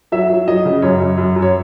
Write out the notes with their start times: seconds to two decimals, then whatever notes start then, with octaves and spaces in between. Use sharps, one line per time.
0.12 F#3 E5
0.30 F#3
0.48 F#3 D#5
0.65 C#3
0.82 F#2 C#5
1.00 F#2
1.18 F#2
1.36 F#2
1.42 C#5